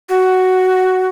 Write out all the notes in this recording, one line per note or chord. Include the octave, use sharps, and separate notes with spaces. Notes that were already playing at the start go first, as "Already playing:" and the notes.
F#4